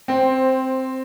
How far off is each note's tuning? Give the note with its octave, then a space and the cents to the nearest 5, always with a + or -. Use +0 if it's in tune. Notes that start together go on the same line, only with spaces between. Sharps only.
C4 +0 C5 +10